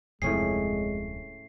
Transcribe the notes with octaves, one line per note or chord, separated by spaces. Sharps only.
D1 F2 A2 C3 G#3 C#4 G#4 C7